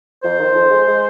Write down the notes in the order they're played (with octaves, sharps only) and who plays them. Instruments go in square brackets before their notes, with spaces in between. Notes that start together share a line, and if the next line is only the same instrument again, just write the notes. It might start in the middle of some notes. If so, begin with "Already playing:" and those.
[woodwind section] F2 C5
D#3
F2
G#3
G#3